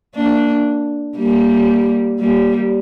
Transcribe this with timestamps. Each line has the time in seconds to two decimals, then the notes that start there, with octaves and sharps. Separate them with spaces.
0.15 A#3 D4
1.17 G3 A#3
2.19 G3 A#3